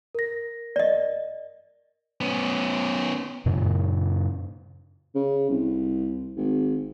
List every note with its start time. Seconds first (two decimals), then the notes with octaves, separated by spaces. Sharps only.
0.15 A#4 A#6
0.76 D5 D#5
2.21 B3 C#4
3.46 F#2 A#2 C#3
5.15 C#3
5.50 C2
6.37 G#1